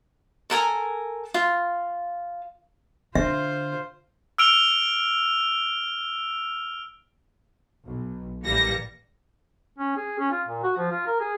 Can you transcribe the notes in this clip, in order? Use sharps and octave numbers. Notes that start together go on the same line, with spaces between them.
A4 A#4 G#5 A#5
F4
D3 F4 C5 E5
E6 F6 D7 F7 G7
B1
A1 E3 G3 A#3 A#6 C#7
C#4
G#4
C#4
F4
A#2
F#4
F3
F4
A#4
G#4